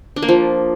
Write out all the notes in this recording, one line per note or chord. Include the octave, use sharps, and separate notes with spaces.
D4
A#3
F3